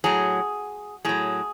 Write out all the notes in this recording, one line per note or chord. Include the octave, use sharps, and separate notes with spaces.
A2 F#3 G#4
A2 F#3 G#4